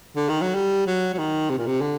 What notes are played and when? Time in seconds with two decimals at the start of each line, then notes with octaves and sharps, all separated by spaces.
0.16 D3
0.29 D#3
0.42 F#3
0.55 G3
0.87 F#3
1.14 F#3
1.18 D#3
1.50 C3
1.58 A#2
1.67 C3
1.81 D3